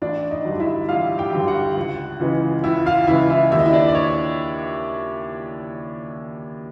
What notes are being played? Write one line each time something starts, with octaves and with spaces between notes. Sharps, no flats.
A1 D4 D5
D#4 D#5
G2 D3 F#3
E4 E5
A1 F4 F5
G4 G5
G2 D3 F#3
F#4 F#5
C#2
C#3 E3 G#3
C#2 E4 E5
F4 F5
C#3 E3 G#3 E4 E5
E4 E5
D#2 E5
D#5
E4 E5
D4 D5
D5
C#5